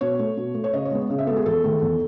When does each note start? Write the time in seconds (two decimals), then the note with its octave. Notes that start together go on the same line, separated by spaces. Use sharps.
0.01 B2 C#5
0.19 A3
0.37 B2
0.54 A3
0.64 C#5
0.73 C#3 D#5
0.85 C#5
0.91 G#3 B3
1.10 C#3
1.18 E5
1.27 G#3 B3 A4
1.36 G#4
1.46 E2 A4
1.64 D#3 A3
1.82 E2